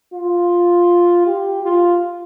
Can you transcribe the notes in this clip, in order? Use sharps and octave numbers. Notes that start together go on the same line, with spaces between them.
F4
G4
F4